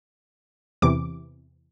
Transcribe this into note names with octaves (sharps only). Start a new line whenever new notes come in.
E2 C3 E3 D6